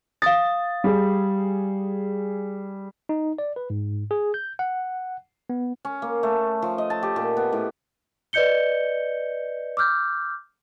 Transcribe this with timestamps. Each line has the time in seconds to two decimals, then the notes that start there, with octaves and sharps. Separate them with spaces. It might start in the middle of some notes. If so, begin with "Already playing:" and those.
0.22 F5 D#6 A6
0.84 G3 G#4
3.09 D#4
3.38 D5
3.56 B4
3.70 G#2
4.11 G#4
4.34 G6
4.59 F#5
5.50 B3
5.85 C#4
6.02 A#3
6.23 A3
6.62 F3
6.78 D#5
6.90 A5
7.03 G4
7.16 A#2
7.37 B3
7.53 A2
8.33 B4 D5 D#5 G6 C#7 G7
9.77 D6 E6 F6 G6